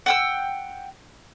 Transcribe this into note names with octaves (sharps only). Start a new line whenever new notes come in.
F#5 G5 E6